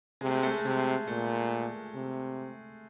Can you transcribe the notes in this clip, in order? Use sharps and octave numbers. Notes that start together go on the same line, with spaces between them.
C3 G#3
A3
G#3
A3
G#3
A3
C3 G#3
A#2 A3
C3